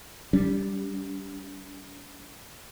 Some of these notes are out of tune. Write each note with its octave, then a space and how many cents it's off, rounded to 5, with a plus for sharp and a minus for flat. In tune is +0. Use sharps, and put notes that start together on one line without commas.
G3 +0 D4 -45